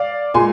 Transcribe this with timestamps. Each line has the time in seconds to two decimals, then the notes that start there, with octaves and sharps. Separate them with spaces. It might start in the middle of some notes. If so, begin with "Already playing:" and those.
Already playing: D5 F5
0.34 A#2 G#3 G#5 C6